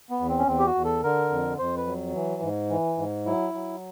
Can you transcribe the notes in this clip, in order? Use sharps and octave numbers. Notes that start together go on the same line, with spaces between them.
B3
E2
C4
C#4
E2 C4
G4
F#4
E2
A4
D3 A#4
F2
F2 C5
B4
F#3
E3
G#2
E3
G#2
F#3 E4
F#3